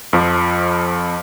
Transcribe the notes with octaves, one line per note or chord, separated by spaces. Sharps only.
F2 F3